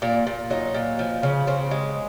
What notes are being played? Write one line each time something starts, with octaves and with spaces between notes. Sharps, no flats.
A#2 D4
A#2
F#3 D#4
A#2
F3
C#3
C#3 C4
G#3